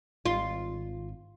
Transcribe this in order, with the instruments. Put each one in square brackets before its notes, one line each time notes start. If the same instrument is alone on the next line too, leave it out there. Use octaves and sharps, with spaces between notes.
[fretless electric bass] G#1 [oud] F4